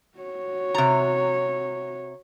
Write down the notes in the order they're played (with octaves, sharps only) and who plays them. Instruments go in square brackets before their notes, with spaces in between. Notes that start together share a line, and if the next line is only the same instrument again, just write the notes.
[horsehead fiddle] F#4 C#5
[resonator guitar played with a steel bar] C3 A#5